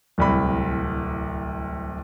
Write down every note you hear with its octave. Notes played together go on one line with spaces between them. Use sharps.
D1 C2 B5